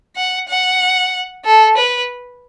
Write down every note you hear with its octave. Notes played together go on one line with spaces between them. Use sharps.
F#5
F#5
A4
B4